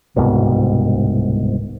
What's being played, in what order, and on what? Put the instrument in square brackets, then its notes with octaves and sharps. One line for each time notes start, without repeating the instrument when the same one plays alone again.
[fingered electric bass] D1 C2 G#2 B2